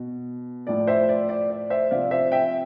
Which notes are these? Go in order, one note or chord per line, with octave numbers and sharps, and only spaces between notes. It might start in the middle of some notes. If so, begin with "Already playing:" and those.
Already playing: B2
A2 F3 D5
C5 E5
D5
D5
D5
C5 E5
C3 F3 D5 F5
C5 E5
E5 G5